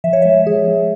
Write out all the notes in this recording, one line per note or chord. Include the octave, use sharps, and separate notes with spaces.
F3 E5
C#5
G#3 E5
F3 G#4
G#3